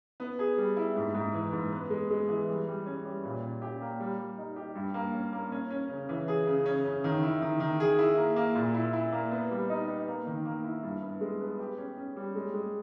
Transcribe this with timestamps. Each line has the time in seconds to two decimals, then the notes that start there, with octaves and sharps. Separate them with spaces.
0.20 B3
0.39 G#4
0.58 G3
0.77 E4
0.96 G#2
1.14 G#2
1.34 E3
1.52 G#2
1.72 B3
1.90 G#3
2.10 G#3
2.29 E3
2.48 G3
2.67 G3
2.86 C#4
3.04 G3
3.23 A#2
3.43 C#4
3.62 G4
3.81 A#3
4.00 G3
4.19 G3
4.38 D#4
4.56 G4
4.75 G2
4.94 A#3
5.14 C#4
5.33 A#3
5.52 C#4
5.70 C#4
5.89 C#3
6.09 E3
6.28 G#4
6.47 C#3
6.65 C#4
6.85 C#3
7.04 D#3
7.23 E4
7.42 D#3
7.60 D#3
7.80 G#4
7.99 E4
8.17 A#3
8.36 A#3
8.55 A#2
8.74 E4
8.93 E4
9.13 A#3
9.31 B3
9.51 G3
9.70 D#4
9.88 B3
10.08 A#3
10.27 D#3
10.45 A#3
10.64 E4
10.83 G2
11.02 B3
11.21 G#3
11.41 B3
11.60 G4
11.78 C#4
11.97 C#4
12.16 G3
12.35 G#3
12.54 G#3